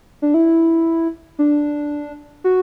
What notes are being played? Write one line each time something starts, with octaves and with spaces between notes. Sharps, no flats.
D4
E4
D4
F#4